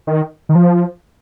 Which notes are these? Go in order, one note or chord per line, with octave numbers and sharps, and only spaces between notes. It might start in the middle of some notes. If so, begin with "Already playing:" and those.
D#3
D#3
F3